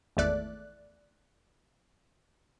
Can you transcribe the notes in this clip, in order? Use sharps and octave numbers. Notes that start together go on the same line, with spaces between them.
G#1 E2 A3 D5 F#6